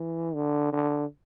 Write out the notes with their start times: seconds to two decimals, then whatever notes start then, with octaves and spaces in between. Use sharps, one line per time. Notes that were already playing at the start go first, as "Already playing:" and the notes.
Already playing: E3
0.35 D3
0.73 D3